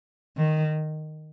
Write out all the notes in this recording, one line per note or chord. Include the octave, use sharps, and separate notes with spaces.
D#3